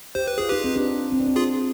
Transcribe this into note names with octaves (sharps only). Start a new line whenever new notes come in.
G4 C5
B4
F4 G#4
D#4 G4 B4
C4
D4
C4
D4
C4
F4 G#4